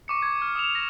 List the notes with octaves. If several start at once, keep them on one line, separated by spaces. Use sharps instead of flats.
C#6 D6 C#7
G#6
F6
D#6 E7 F7
A#6 E7